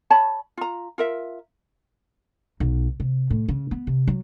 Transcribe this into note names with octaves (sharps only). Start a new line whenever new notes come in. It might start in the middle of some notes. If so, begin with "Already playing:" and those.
C#5 A5 B5
F4 A#5
F4 A#4 E5
B1
C3
A2
C#3
B3
C3
F#3